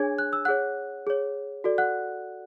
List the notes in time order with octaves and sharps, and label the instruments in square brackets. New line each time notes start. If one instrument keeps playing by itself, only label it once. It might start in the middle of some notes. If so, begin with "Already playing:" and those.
Already playing: [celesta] D4 G#4 C#5 G#5 G#6
F#6
E6
G#4 C#5 F#5 F#6
G#4 C#5
F#4 A4 D5
F#5 F#6